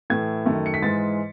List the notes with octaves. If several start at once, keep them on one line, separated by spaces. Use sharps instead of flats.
A2 E3 A3 G#6
F#2 D#3 A3
C#7
B6
G#2 E3 G#3 A6